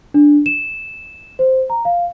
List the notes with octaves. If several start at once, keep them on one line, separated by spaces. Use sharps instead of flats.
D4
E7
C5
A#5
F5